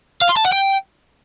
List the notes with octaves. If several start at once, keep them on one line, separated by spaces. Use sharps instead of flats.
F5
C6
A5
F#5
G5